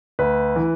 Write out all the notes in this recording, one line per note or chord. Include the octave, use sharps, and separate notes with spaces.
D2 B4
E3